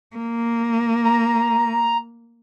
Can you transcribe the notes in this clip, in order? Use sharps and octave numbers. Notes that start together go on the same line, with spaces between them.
A#3
A#5